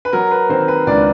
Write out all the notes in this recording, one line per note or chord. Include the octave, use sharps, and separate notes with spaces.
B4
F#3 A#4
B4
D#3 C4 C5
B4
C#2 D4 D5